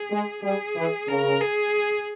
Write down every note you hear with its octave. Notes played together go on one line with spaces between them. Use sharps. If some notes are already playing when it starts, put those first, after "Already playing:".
Already playing: G#4
G#3
G3 G#4
E3
C#3 A#4
G#4